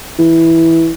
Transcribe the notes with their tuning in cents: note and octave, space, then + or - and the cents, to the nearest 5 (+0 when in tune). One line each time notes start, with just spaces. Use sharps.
E3 -5